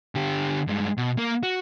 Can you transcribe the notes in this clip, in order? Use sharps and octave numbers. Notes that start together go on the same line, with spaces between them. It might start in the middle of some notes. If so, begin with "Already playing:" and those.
D3 G4
G2 G#3
B2
A#3 A#4
F#4